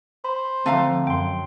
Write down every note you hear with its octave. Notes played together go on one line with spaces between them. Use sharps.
C5 B5
D3 F3 A3 C4 F5 A#5
F#2 G5 C6